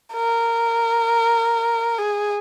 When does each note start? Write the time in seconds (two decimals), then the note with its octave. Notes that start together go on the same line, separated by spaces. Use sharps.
0.13 A#4
1.98 G#4